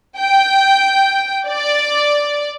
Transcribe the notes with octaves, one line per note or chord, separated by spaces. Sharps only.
G5
D5